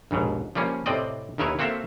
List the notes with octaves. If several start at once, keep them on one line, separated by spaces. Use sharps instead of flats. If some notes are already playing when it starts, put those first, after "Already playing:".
A#1 D#2 G#2 B2
F3 G3 A#3 C#4
A2 C3 C4 D5 D#5
D#2 D#3 E4 A#4 B4 C#5
A#3 C4 F#4 A4 E5 F5